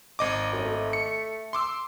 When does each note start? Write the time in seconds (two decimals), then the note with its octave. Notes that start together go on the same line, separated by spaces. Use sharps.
0.19 G#1 D#5 D6
0.52 F#2
0.65 A3
0.93 C#7
1.53 C6 D6 E6